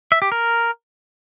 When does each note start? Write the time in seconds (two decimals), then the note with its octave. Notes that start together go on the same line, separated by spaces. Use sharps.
0.12 E5
0.22 G4
0.32 A#4